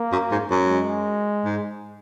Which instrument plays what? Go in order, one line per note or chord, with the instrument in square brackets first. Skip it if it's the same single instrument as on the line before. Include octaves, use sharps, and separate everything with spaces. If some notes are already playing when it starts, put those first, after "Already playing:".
Already playing: [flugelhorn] A#3
[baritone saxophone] F#2
G#2
F#2
[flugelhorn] G#3
[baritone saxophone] G#2